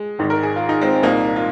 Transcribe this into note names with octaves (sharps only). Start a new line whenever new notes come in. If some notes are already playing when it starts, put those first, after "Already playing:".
Already playing: G#3
G#1 G#2 D#3
A#4
G#4
F4
D#4
G#3 C4
C2 A#2 A#3 D#4
F4